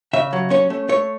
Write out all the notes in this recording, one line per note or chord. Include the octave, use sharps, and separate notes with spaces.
C#3 E5
F#3
C#4 C#5
A3
A3 C#5